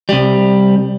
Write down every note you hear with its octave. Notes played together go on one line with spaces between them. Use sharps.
C2 G3